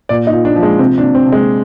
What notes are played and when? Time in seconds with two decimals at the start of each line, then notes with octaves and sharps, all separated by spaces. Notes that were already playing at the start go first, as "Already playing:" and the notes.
0.09 A#2 D5
0.27 D#4
0.33 A#2
0.45 D4
0.56 F3
0.63 G#3
0.79 C3 C4
0.98 D4
1.03 C3
1.15 C4
1.27 C3
1.32 G#3